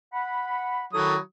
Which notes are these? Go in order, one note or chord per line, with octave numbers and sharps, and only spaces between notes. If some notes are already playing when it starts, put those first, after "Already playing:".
F#5 B5
D#3 F#3 E4 A4 D#6